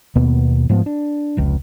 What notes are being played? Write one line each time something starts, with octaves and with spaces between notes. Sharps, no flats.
D#2 B2 A#3 B3
G#2 F3 A3 B3
D4
F1 C#2